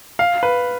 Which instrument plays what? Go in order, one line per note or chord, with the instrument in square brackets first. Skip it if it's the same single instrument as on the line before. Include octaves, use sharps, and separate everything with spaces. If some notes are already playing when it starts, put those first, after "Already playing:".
[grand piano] F5
B4